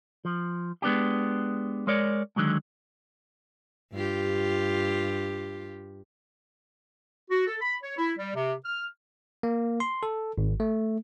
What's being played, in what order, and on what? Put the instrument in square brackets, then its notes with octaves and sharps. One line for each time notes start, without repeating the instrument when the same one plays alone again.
[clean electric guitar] F3
G#3 B3 D4 G4
G#3 A#4 C#5 D5
D3 D#3 F#3 G#3
[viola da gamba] G2 F4 G4
[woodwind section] F#4
A4
B5
C#5
E4
G3
C3
F6
[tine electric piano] A#3
C6
A4
G#1
A3